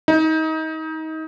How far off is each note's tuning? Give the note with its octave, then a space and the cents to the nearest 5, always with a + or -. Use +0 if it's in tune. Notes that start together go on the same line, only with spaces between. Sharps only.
D#4 +25